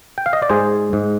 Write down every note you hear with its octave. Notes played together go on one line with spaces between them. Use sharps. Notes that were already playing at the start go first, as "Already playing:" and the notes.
G5
F5
D#5
D5
G#2 G#4 C5
G#2